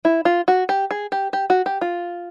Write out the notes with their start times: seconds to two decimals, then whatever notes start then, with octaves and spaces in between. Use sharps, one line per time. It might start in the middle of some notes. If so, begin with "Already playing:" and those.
0.05 E4
0.25 F4
0.48 F#4
0.69 G4
0.91 G#4
1.12 G4
1.33 G4
1.50 F#4
1.66 G4
1.81 F4